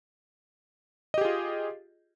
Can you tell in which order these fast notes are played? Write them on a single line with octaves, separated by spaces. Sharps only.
D#5 G4 G#4 F4